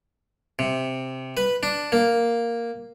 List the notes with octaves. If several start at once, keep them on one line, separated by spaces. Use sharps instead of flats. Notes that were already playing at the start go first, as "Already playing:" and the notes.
C3
B4
D4
A#3